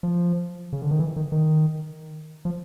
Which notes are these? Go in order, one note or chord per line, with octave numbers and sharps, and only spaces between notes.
F3
C#3
D3
D#3
E3
D#3
D#3
F3